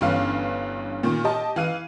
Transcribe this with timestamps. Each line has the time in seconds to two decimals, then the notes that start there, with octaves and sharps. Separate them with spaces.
0.01 G1 G2 E3 C#4 F5
1.03 A#2 D#3
1.24 G4 D#5 A5
1.56 E3 F5 D#7